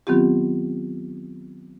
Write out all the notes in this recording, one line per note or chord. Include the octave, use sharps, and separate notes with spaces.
D#3 F#3 B3 C4 F4 G4